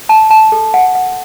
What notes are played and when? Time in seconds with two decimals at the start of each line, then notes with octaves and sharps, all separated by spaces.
0.09 A5
0.31 A5
0.52 A4
0.74 F#5
0.95 F#5